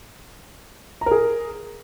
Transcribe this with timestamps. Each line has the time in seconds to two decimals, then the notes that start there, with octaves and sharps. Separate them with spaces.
1.01 A#5
1.06 A#4
1.11 G#4